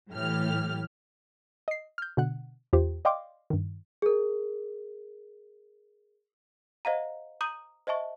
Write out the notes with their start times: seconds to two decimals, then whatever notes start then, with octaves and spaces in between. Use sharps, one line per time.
0.11 A2 E3 F#3 G4 F6
1.68 D#5 C7
1.98 F6 G6
2.17 B2 D3 F#5 F#6
2.73 E2 F4 G4 C5
3.05 D5 D#5 F5 G5 C6 D6
3.50 G2 D#3
4.02 G#4 A#4
6.85 C5 D#5 F5 F#5 A#5
7.41 A#5 D#6 G6 D#7 F#7
7.87 C5 D#5 E5 A5 C#6